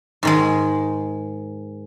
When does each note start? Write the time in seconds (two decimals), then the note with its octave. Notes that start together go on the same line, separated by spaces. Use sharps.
0.23 G#2 D#3 G#3